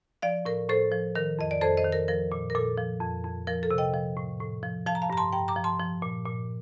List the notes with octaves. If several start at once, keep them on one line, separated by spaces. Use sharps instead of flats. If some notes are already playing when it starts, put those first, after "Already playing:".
F3 D5 F5
A2 A#4
A2 A4 C5
F3
D#3 A#4
F2 D#5
D5
F2 A4 C5
C5 D#5
D#3
A#4
F3 A#4
A#2
A#4
A#2 A4
F3
F2
F2
F3 A#4
A4
C3
D#5 G5
F3
A2
A2
F3
F3 F5 A5
A#5
F5 A5
G2 A#5
A5 C6
G2 G5 A#5
A#5 D6
F3
A5 C6
F3
A#2
A#2